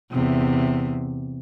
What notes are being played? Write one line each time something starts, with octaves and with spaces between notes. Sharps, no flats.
E2 C3